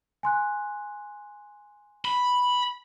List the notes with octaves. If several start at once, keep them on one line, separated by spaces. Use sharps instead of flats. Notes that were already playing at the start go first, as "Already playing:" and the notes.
G#5 C6 F#6
B5